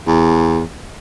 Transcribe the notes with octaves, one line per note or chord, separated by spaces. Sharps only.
E2